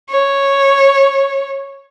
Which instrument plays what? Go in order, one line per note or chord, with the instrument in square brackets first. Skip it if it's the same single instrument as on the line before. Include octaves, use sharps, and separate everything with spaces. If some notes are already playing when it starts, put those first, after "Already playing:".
[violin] C#5